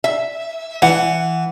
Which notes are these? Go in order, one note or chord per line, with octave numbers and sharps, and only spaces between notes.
E5
E3 F#5